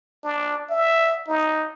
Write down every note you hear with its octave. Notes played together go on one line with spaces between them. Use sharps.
D4
E5
D#4